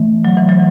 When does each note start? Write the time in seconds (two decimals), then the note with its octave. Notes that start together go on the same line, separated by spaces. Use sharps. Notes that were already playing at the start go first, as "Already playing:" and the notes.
Already playing: E3 A3
0.25 F#3
0.37 E3
0.49 F#3